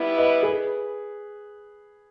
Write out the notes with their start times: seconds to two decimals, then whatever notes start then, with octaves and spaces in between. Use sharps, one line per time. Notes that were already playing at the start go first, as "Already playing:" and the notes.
Already playing: G3 B3 E4
0.17 B4 D#5
0.43 G#4 B4